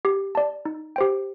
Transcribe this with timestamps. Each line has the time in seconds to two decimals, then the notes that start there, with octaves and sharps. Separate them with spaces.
0.05 G4
0.35 D5 A5
0.65 D#4
0.96 G4 C5 G5